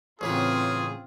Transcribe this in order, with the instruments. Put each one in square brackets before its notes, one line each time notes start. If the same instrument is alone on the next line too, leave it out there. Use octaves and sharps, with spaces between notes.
[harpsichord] A1 C#3 B3 [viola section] C4 F4 [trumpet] G#4